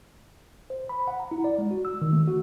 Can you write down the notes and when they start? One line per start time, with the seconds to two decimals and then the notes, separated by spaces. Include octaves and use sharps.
0.70 C5
0.89 B5
1.08 F#5
1.20 A#5
1.31 E4
1.44 D5
1.58 G#3
1.71 F#4
1.85 E6
2.02 D#3
2.13 A3
2.28 F#4